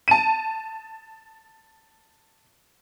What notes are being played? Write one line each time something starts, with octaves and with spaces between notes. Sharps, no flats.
A5 D#7